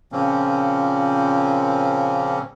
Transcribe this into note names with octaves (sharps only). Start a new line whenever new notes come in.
A#2 C#3 F3 A#3 C4 C#4